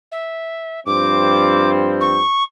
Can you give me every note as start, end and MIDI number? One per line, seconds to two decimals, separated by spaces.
0.12 0.80 76
0.86 2.20 43
0.86 2.20 53
0.86 2.20 60
0.86 1.70 86
2.01 2.43 85